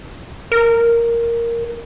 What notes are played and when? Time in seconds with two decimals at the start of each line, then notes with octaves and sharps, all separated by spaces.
0.52 A#4